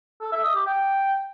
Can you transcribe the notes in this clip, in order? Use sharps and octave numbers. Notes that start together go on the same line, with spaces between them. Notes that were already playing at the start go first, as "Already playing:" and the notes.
A4
E5
D#5
G4
G5